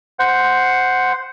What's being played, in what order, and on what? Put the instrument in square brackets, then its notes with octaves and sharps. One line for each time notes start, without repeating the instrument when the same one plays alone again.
[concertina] C5 F#5